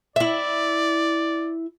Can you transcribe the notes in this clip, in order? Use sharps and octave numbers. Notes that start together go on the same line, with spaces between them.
E4 D5 E5